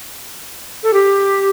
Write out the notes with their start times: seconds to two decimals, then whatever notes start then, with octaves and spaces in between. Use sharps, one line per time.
0.84 A4
0.94 G4